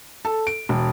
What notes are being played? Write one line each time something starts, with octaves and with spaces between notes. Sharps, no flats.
A4
D7
E1